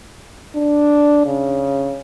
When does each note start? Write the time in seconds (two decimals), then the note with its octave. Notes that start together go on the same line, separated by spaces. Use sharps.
0.55 D4
1.26 C#3